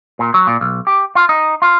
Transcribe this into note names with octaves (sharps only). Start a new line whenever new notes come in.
A#2
F#3
A#2
B1
G4
F4
D#4
F4